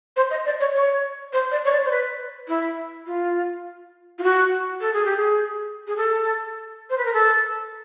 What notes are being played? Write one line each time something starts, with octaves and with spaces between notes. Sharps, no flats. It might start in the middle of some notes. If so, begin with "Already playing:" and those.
C5
D#5
D5
C#5
C#5
C5
D5
C#5
D5
C5
B4
E4
F4
F4
F#4
A4
G#4
G4
G#4
G#4
A4
C5
B4
A#4
A4